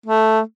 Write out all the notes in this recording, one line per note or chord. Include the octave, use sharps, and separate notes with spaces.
A3